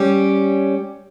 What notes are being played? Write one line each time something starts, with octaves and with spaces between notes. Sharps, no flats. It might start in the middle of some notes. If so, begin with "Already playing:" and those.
Already playing: G3 C#4 G4